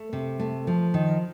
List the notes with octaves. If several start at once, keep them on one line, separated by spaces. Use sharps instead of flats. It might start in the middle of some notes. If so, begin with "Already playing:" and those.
Already playing: A3
C3
A3
F3
D#3